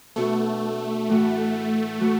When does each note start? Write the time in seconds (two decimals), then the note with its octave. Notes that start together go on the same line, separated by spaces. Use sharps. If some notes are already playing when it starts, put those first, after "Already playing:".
0.16 B2 A3 B3 D4 F#4
1.09 A2 E3 A3 F#4
2.00 E3 A3 F#4